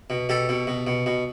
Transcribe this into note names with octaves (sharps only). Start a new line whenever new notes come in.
B2
B2 G4 A4
B2
B2
B2
B2